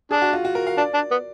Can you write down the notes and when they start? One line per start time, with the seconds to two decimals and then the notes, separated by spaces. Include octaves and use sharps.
0.11 D4 G#4
0.22 F#4
0.33 F4
0.45 F#4
0.55 A#4
0.67 F5
0.77 D4 D5
0.94 D4
1.11 B3